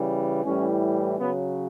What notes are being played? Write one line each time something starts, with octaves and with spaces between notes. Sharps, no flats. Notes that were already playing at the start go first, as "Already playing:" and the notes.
Already playing: C#3 E3 G3
A2 E3 G3 C#4
C#3 F#3 B3